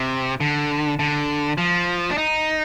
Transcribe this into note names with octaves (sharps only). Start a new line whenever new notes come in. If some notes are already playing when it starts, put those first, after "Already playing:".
Already playing: C3
D3
D3
F3
D4
D#4